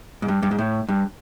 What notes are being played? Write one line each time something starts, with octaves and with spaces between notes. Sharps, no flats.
G#2
G2
G2
G#2
A2
G2